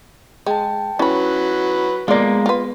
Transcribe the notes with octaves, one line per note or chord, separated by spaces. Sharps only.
G#3 G5 A5
F#3 C#4 E4 B4 B5
G#3 A#3 B3 F4 D5
F4 B4